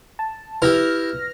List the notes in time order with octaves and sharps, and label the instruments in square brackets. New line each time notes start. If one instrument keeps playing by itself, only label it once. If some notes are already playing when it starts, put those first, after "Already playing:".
[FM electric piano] A5
[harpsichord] E4 G4 [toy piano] B4 [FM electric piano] F6 A#6